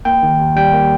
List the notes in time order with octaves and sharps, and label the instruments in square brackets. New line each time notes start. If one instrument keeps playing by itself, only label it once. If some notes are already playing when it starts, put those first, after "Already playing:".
[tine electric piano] A#3 G5
D#3
D#2
G3 G5
A#3